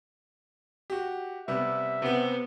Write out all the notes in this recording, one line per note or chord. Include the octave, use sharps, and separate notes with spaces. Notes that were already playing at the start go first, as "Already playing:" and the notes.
F#4 G4
C3 G3 B3 E5
C3 B3 C4